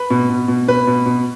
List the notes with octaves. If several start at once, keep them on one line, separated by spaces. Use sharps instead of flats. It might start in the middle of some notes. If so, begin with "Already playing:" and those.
Already playing: B4
B2
B2
B2
B2 B4
B2
B2